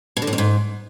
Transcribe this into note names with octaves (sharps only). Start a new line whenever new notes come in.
B2
D3
A2
F2
G#2